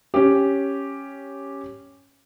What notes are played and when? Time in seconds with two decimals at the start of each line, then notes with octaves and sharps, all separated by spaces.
0.14 C#4 G4